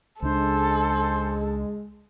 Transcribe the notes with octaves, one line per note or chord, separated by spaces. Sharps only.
C#2 G#3 D4 A4 C5